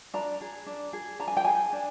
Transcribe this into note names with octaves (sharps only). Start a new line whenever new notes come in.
D4 A#5
G#4
D4
G#4
D4 A#5
G#5
G5
G#4 G#5
D4